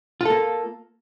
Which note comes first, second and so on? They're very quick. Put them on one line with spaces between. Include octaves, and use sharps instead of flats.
F4 A4 A#3